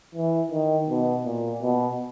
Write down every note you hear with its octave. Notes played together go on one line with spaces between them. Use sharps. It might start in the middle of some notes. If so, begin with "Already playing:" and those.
E3
D#3
B2
A#2
B2